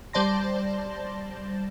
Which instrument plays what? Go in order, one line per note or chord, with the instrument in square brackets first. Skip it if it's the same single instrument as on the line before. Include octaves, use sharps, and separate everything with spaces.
[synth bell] G3 C5 D5 A5 C6 A#6